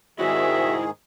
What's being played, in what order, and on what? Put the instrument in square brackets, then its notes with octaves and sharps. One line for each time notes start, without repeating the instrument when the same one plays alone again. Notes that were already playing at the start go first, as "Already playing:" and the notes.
[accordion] G#2 D#3 G#4 [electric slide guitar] E4 C5 D5 [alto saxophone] F#4 [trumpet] E5